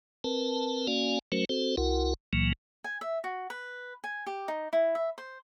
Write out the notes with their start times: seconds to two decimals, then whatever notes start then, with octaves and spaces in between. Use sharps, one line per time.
0.24 C4 A#4 B4 A5
0.87 A#3 C#4 F#4 D5 F5 G#5
1.32 F#3 A3 C#4 F#4 A#4 C5
1.49 C4 F#4 A4 C5
1.77 C2 E4 F#4 A#4 F#5
2.33 C#2 A#2 E3 F#3 A#3
2.84 G#5
3.01 E5
3.24 F#4
3.50 B4
4.04 G#5
4.27 G4
4.48 D#4
4.73 E4
4.95 E5
5.18 C5